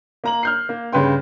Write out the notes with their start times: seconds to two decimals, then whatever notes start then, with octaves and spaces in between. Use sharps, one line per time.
0.24 A#3 A#5 F#7
0.43 F6 G6 C7
0.69 A#3
0.92 G2 C#3 B4 G5 C6